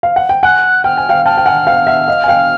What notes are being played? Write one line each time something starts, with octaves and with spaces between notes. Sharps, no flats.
F5
F#5
G5
F#5 G#5 F#6
G5 F6
G#5
F5 G5
G5 A5 F6
G5
F#5 G#5
F5 G5
E5 F#5
D#5 F5
G#5
F5 G5